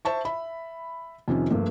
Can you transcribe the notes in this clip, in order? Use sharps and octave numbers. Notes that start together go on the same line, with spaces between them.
C5 E5 A5 C#6
E5 B5
F2 C3 D#3 C#4
G2 F3 A3 A#3